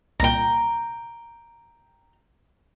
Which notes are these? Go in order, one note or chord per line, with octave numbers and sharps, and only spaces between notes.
C2 A#2 G5 A#5